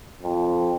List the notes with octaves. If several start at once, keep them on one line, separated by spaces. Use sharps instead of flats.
F2